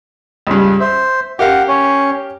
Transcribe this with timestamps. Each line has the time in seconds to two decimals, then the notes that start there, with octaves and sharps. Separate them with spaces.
0.47 C#2 G2
0.80 C5 E5
1.39 G4 A#4 F5 F#5
1.68 C#4 C#5